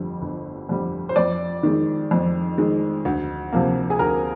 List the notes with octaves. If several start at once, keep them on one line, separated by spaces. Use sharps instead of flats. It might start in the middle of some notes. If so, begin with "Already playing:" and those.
Already playing: G1 F2 D3 G3
G1
F2 D3 G3
C5
F2 D5
D#3 G#3
F2
D#3 G#3
D2
C3 F3 A#3
G#4
D2 A#4